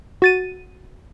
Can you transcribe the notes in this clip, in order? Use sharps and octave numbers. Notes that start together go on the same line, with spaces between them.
F#4 A6 D#7